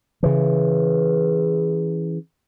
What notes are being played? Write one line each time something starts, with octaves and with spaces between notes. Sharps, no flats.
C#3 E3